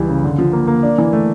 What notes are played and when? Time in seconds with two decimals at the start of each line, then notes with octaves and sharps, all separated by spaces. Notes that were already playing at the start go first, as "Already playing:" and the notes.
Already playing: C#2 E3 G3
0.09 C#3
0.24 D3
0.38 F3
0.53 A#3
0.67 A#3
0.83 D4
0.98 E3
1.13 A3